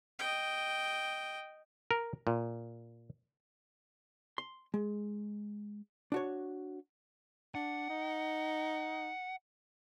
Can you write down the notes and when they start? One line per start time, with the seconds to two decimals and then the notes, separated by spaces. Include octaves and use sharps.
0.19 D#5 G5
1.91 A#4
2.27 A#2
4.38 C6
4.74 G#3
6.12 D4 F#4 C#5
7.55 D4 F#5
7.89 D#4